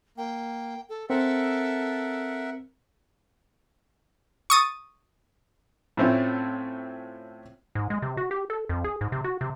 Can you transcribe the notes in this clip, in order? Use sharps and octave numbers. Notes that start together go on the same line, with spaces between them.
A#3 G5
A4
C4 A4 A#4 E5 F#5
C#6 D#6 A6
A2 A3 C4 C#4 F4
G#2
G#3
C3
F#4
G4
A4
F2
G#4
G#2
C3
F#4
C3